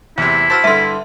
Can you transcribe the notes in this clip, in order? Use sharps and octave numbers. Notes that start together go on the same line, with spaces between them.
E2 C3 E4
F#4 C5 A5 C6 E6 F6
G2 D3 E5 C6